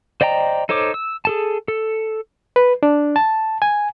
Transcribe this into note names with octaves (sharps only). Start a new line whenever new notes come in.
C5 D5 D#5 G5 A#5
D#4 A4 C5 C#5 D6
E6
G#4 A4 A5
A4
B4
D4
A5
G#5